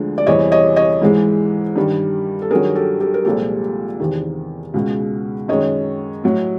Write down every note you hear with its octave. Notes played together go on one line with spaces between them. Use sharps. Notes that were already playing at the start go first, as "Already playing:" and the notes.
Already playing: D2 D3 F3 G#3
D5
E2 C3 E3 G3 C#5 D#5
C#5 D#5
C#5 D#5
G#2 E3 G#3
G2 D#3 G3
A4
G2 D#3 F#3 G#4 A#4
G4 A4
G4 A4
A#4
C2 A#2 F3 G#3 G4 A4
E2 C3 D#3
C#2 B2 G#3
F#2 D#3 G#3 C#5 D#5
A2 F#3